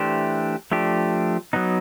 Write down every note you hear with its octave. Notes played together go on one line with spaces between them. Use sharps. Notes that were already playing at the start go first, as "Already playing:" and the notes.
Already playing: E3 A3 D4 G4 C5
F3 A3 D4 G4
F#3 B3 D#4